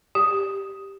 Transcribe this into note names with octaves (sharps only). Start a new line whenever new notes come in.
G4